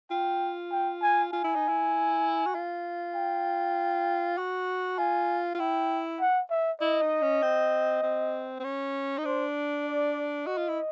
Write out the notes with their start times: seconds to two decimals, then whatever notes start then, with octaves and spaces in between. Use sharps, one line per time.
0.11 F4 G5
0.72 G5
1.02 G#5
1.33 F4 G#5
1.44 E4
1.55 D#4
1.68 E4
2.46 F#4
2.55 F4
3.15 G5
4.37 F#4
4.98 F4 G#5
5.55 F4
5.59 E4 G5
6.20 F#5
6.51 E5
6.81 E4 D#5
7.02 D#4
7.22 C#4
7.42 C4
8.03 C4
8.60 C4
8.64 C#4
9.18 D#4
9.25 D4 C5
9.86 D5
10.46 F#4 D#5
10.57 F4
10.69 E4